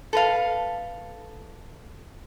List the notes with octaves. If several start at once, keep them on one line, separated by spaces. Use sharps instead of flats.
A4 B4 F5